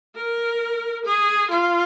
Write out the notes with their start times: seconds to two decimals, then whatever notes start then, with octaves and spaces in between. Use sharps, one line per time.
0.15 A#4
1.05 G#4
1.50 F4